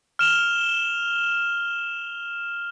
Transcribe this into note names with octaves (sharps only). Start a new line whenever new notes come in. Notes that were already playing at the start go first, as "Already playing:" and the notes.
F6 E7 F7 G7